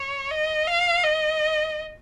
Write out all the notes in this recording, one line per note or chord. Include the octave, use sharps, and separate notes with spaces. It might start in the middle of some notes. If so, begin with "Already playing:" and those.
Already playing: C#5
D#5
F5
D#5